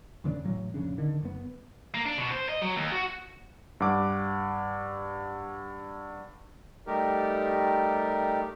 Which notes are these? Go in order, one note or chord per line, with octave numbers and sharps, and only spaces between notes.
E2 C#3 A3 D4
A2 E3 F#3
F1 A#1 C#3 D4
D3 D#3
F#1 B3
A#3
D4
B2
C5
D#5
F#3
D#2
F#4
G2 F#5 D6
G3 A3 D#4 G4 A#4